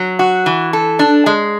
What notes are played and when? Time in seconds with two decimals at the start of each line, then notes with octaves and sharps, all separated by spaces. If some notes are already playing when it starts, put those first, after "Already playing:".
Already playing: F#3
0.19 F#4
0.46 E3
0.73 A4
0.99 D4
1.26 G#3